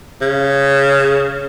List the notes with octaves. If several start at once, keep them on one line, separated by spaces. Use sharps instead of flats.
C#3